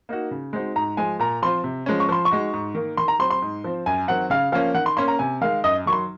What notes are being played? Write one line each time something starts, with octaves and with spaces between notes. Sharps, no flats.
A#3 D#4 F#4
C#3
G#3 C4 D#4 F#4
G#2 A#5
F3 G#3 G#5
A#2 A#5
F3 C4 F4 C6
C3
F3 G#3 C#4
C#6
F3 C6
C#6
G#3 D#4 F#4
G#2
D#3 A#3
D#3 C6
A#5
F#3 C4 C6
C6
G#2
F3 C4
F#2 G#5
D#3 F#3 C4 F#5
C#3 F5
F3 A#3 C#4 F5
D#3 F#5
C6
A#3 C#4 C6
A#5
C3 G#5
D#3 G#3 F5
F#2 D#5
D#3 F#3 C#6
C6